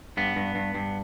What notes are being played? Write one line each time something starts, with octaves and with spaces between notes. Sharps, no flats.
G2 B3
G2
G2
G2